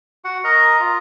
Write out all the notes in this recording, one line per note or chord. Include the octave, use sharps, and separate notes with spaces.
F#4 F#5
A#4 D#5 A#5
F4